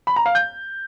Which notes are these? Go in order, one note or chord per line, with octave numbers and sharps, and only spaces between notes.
B5
A#5
F5
G6